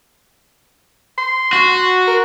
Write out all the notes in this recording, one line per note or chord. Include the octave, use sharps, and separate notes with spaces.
C6
F#4
A#4